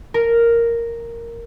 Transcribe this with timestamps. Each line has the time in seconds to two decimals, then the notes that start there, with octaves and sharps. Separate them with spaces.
0.14 A#4